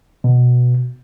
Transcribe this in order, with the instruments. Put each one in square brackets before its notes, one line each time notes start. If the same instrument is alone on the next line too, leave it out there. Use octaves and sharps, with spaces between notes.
[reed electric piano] B2